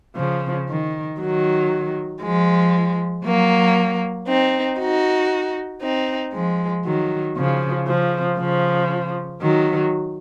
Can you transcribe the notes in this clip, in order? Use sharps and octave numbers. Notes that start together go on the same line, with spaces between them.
C#3 F3
D#3
D#3 F#3
F3 G#3
F#3 A#3
C4 D#4
D#4 F#4
C4 D#4
F3 G#3
D#3 F#3
C#3 F3
C#3 F3
C#3 F3
D#3 F#3